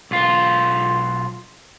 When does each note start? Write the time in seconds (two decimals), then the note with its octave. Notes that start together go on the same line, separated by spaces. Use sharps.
0.11 B1 F4